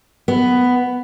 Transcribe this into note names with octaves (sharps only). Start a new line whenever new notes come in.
B3